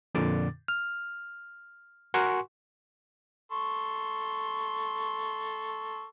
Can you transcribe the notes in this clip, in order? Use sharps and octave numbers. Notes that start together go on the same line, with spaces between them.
F2 A#2 D3 D6 A6
F6
F#4 A#4 F#5 G#5 C6 C#6
A4 C6 C#6